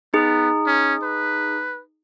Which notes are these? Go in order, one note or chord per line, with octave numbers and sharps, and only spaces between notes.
B3 D#4 G#4
C#4
B4